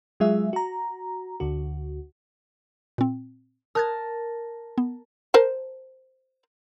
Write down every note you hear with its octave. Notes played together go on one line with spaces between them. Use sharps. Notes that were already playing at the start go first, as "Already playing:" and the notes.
F#3 G#3 F4 G#4 E5
F#4 A#5
D2 D3 F#4
A#2 C4
A#4 A5 D#6 F#6 G#6
B3
A#4 C5 A5